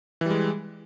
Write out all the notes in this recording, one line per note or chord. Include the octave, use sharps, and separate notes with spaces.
E3 G3 G#3